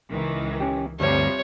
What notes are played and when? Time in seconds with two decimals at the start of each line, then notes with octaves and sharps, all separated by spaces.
0.11 C#2 D#3 E3
0.60 C#4 G4
1.00 D2 G2 C3 F3 G3 C#5